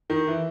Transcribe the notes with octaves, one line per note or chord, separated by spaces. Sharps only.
D#3
E3